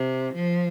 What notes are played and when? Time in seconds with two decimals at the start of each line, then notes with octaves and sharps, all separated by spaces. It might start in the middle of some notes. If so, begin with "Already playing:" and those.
Already playing: C3
0.35 F3